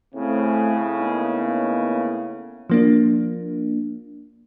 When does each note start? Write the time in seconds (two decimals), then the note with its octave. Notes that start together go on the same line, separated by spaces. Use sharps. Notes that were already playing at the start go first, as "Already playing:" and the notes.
0.15 A2 C#3 A3 C4
0.99 A#3 B3 D#4
2.70 F3 A#3 D4